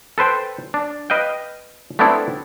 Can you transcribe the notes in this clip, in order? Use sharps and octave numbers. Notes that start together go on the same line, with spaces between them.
A4 B4 C5 G5
D4
B4 D#5 F5 G5
A3 B3 C4 D4 E4 A4